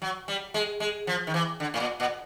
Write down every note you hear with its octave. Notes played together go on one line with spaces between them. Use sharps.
F#3
G3
G#3
G#3
F3
D#3
E3
D3
A2
A#2
A#2